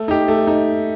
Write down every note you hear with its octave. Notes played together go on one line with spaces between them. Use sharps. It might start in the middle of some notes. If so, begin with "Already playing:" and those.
Already playing: A3
D#4 G4
A3
D#4